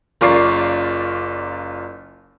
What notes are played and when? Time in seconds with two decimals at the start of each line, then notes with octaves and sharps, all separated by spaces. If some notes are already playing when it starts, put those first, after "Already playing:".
0.21 F#1 F4 A#4 D5 C#6 C7